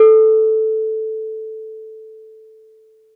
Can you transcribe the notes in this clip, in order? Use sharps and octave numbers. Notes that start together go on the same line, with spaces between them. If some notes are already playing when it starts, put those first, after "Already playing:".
Already playing: A4